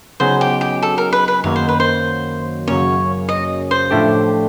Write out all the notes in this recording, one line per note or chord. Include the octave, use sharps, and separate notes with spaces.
C#3 F#3 B3 D#4 G#4 C5
G4
G4
A4
A#4
B4
B4
F#2 D#3 F#3 A#3 C#5
C5
B4
C5
F#2 C#3 F#3 A#3 C#4 C#5
D#5
C5
A2 F3 A3 D4 G4